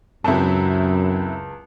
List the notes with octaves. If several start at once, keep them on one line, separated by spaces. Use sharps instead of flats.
C#2 F#2 F#3 C4 E4 A5